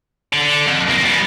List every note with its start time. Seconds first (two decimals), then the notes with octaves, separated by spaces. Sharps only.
0.33 D3
0.66 F2
0.88 C#2 A#3
1.03 G3 B3